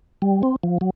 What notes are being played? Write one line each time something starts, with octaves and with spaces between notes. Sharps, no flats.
G3
C4
F3
F#3